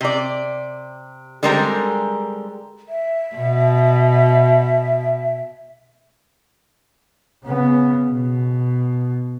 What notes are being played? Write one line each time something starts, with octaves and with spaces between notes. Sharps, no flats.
C3 D5
D3 G3 G#3 C4 A#4
E5
B2
C#3 B3
B2